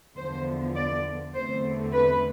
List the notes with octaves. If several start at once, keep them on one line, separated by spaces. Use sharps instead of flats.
E2 D3 F3 B3 C5
D5
E2 D3 A3 C4 C5
B4